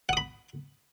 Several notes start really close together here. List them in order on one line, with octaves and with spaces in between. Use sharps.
F#5 D#6 B5